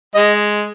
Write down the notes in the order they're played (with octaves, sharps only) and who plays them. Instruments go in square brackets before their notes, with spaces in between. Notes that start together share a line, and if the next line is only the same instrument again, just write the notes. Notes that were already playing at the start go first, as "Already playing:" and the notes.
[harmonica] G#3 [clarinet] D#5